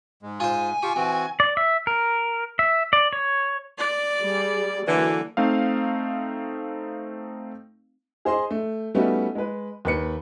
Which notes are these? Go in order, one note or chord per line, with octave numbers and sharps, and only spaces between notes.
G#2 G#3
F4 C5 G#5
F4 G4 C#6
E3 C4 F#4
D5
E5
A#4
E5
D5
C#5
D5
G3 G#4
D3 E3 F#3 A#3
A3 C4 D#4 F5
G#4 C5 D#5 C6
A3
G3 A3 B3 C#4 D#4 F#4
G#3 B4
D#2 B4 C#7